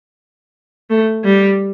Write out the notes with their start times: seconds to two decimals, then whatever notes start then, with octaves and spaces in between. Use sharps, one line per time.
0.90 A3
1.24 G3